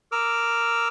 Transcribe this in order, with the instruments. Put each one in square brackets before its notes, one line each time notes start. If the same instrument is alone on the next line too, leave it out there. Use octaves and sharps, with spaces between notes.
[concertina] A#4 D6 E6 F6